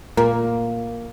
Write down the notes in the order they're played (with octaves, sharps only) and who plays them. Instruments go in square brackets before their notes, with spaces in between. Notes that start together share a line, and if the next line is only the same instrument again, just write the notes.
[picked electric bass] A#2 [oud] A#3